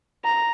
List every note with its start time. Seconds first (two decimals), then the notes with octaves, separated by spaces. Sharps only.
0.25 A#5